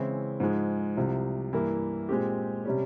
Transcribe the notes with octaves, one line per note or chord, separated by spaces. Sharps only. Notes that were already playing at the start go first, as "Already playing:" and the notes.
Already playing: C#3 E3 G#3 C4 E4
G#2 F3 G#3
C2 C3 F3
G2 E3 A#3 E4
A#2 G#3 C4 G4
C3 G3 C#4